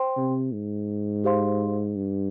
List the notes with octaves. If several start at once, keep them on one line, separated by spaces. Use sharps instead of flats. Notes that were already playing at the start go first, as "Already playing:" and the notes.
Already playing: C5 G5 C6
C3
G#2
G4 C5 F5 C6
G2